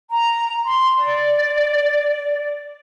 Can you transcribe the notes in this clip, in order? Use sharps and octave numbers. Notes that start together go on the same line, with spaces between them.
A#5
C6
D5